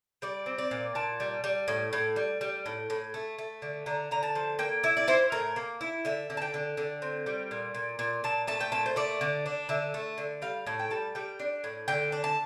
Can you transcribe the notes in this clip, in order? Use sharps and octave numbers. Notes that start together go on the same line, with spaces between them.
G3 D5
C4
D5
A#2
A#2 A5
G3
G3
A2
A2
G3
G3
A2
A2
A3
A3
D3
D3 A#5
D3 A#5
A5
F3
A#3 G5
E4 E5
D5
E4 C5
A2 A#4
A#3
E4
D3 E5
D3
A5
G5
D3
D3
C4
G3
A#2
A#2
A#2
A#2 A5
A3 A5
G5
A#2 A5
C5
A3 D5
D3
D4
D3 E5
A3
D3
G3 F5
A2 A5
G5
G3 A5
G3 G5
D4
A2
D3 G5
D4
A5